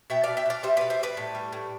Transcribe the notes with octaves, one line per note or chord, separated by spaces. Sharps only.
B2 E5 G5
B2 D5 F5
E5 G5
B2 D5 F5
G3 C5 E5
B2 B4 D5
C5 E5
G3 B4 D5
A2
G3
A2